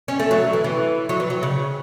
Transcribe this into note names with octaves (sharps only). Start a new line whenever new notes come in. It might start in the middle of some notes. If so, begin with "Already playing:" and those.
C#4
A3
F#3
E3
E3
F#3
E3
F#3
C#3